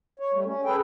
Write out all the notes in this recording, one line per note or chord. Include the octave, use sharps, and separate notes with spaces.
C#5
G3 A3
C#4
G#4 A4 B4 G5